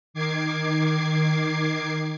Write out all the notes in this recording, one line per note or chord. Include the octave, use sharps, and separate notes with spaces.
D#3 D6 G#6 C7